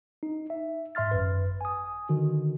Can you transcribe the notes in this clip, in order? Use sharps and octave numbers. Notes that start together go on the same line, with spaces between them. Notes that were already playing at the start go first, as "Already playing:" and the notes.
D#4
E5
G#2 E5 C6 F6 A6
G#1 F#2 B4
G#5 D#6
D3 D#3 F#4